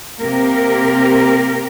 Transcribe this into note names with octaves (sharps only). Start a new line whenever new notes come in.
C3 A#3 G4 A#4